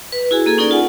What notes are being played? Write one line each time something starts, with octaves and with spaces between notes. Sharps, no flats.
B4
E4 F#4 G#4 G#5
A#3 G#4 A4
C#4 D#4 G#4 A#4 D5
F4 F#5 G#5